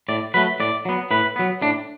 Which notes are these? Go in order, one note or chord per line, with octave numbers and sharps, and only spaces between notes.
A2 D5
F#3 A3 B4
A2 D5
F#3 B3
A2 B4
F#3 B3
A2 D4